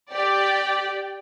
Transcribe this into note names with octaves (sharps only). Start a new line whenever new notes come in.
G4 D5 G5